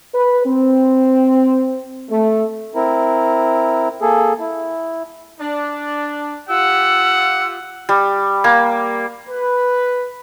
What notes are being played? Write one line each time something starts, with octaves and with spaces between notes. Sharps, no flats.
B4
C4
A3
C4 E4 A#4
A#3 G#4 A4
E4
D4
F4 G4 F#5 E6
G3
A#3
B4